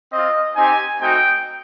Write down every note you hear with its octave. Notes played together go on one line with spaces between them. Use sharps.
C4 F4 D#5
C4 D#4 G4 G#5
A3 C4 D#4 F#4 G5